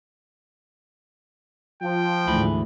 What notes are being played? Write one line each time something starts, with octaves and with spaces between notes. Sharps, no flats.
F3 G5
D2 G#2 E3 B5